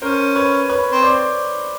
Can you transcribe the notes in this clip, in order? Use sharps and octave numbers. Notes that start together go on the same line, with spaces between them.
C#4 A#4 C5
B4 C#5
B4 C#5
C4
C5 D5